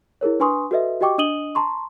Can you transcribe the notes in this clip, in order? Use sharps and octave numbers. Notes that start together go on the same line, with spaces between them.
E4 G#4 A#4 C#5
D4 B4 G#5 C6 C#6 D#6
F#4 A4 B4 D#5 E5
F#4 G4 D#5 G5 C#6 D6
D4 D#5 D#6 D#7 F#7 G7
A5 A#5 C6 C#6